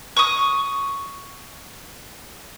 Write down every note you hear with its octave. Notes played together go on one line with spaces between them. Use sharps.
C#6 D#6